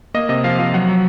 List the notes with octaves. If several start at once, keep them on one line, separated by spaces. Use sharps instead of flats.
A#3 D#5
C3 D#5
F3 F5
F3 F5
F#3 F#5
F#3